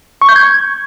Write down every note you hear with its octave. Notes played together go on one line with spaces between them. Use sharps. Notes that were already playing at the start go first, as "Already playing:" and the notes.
C#6
G6
G#6